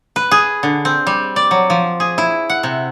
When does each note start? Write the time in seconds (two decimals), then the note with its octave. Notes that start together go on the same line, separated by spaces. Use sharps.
0.16 B4
0.31 G#4
0.63 D3
0.85 C4
1.07 G3
1.36 D5
1.51 F#3
1.70 F3
2.00 G#4
2.18 E4
2.50 F#5
2.63 C3